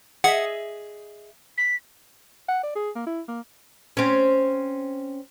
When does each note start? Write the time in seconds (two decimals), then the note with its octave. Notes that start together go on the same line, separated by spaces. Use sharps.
0.24 G#4 D#5 E5 F#5
1.58 B6
2.49 F#5
2.63 D5
2.75 G#4
2.95 A#3
3.07 E4
3.28 A#3
3.97 C4 C#4